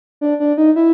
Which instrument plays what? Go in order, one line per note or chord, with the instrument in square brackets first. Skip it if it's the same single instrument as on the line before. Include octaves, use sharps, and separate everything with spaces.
[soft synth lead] D4
D4
D#4
E4